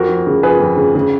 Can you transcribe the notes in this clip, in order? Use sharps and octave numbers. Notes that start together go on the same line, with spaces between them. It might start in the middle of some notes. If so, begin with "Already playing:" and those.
Already playing: F2 F#4 A#4
F3
C#3
F3 G#4 B4
F2
C#3
C#3